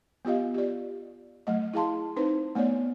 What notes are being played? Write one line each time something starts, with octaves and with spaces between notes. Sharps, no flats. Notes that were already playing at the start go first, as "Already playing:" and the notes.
B3 F4 G4 D#5 F5
G4 D5
F#3 A3 D#5
E4 G#4 F5 A5 C6
C4 D#4 B4 C5
A3 B3 C#5 D5